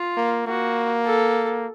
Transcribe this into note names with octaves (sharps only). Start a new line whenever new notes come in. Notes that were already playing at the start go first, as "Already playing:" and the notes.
Already playing: F4
A#3
A#3 F#4
A4